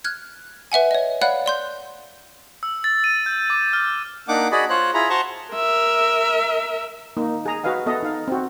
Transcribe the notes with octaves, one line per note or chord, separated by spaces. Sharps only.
F6 F#6 G#6
B4 E5 F#5 G#5
C#5 D#5
C#5 D5 F5 F#5 B5 F#6
D5 C6 G6
E6
A6
D#7
G6
D6
F6
A#3 D4 D#4 F#5 D6
F#4 G#4 D5 D#5 B5
F4 C5 C#5 F#6
E4 F4 G#4 A#5 B5
F#4 C5 A5 A#5 C6 C#6
A#4 E5
A#3 D#4
G#4 A#5
F#4 B4 D#5 F5 G#5
B3 A4 D#5 E5
D#4 F5
C4 F#4